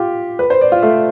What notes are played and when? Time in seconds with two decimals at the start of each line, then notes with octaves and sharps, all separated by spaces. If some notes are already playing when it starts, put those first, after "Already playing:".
Already playing: F4 G4
0.39 B4
0.50 C5
0.61 D5
0.72 F4
0.82 A3